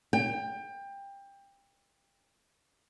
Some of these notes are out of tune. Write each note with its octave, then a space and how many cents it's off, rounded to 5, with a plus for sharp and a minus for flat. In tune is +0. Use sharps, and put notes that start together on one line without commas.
G5 +25